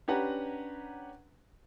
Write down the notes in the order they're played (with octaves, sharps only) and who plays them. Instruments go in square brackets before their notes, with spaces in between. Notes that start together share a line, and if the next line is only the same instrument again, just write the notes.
[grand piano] C#4 D4 G4 B4 F#5 A#5